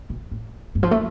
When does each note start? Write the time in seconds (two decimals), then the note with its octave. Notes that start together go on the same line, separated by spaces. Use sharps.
0.10 B2
0.32 A2
0.75 G2
0.83 F3
0.91 A3